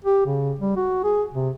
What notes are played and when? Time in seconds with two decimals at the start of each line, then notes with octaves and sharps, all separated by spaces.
0.04 G4
0.26 C#3
0.59 G3
0.76 F#4
1.04 G#4
1.34 C3